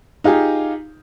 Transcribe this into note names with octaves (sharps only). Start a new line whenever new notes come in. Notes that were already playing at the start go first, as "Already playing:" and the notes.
D#4 F4 G4 G#4